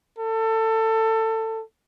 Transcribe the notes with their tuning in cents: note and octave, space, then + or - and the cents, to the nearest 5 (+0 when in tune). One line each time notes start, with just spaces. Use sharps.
A4 +20